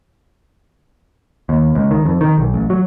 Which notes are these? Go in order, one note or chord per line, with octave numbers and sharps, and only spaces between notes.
D#2
C#2
D#3
F2
D#3
B1
A1
F#3